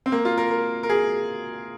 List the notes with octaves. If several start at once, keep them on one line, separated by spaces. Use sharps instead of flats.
C4
A#3
F4
A#4
A#4
A#4
G#4